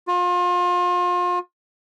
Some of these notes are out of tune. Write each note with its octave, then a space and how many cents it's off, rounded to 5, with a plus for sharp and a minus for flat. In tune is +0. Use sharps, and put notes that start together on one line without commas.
F4 +35